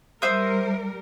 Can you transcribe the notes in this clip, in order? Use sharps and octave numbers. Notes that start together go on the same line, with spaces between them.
G3 A#4 C5 E5 D#6